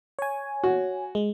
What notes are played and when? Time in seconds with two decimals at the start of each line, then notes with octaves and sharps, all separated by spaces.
0.19 C#5 G#5
0.64 F#4
1.15 G#3